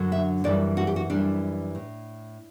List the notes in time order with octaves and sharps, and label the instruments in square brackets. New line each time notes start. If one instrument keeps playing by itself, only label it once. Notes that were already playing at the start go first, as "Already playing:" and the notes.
Already playing: [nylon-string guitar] F#2 D3 F#3
E5
F#2 E3 G3 D5
F#4
G4
F#4
F#2 E3 G3 D4
A2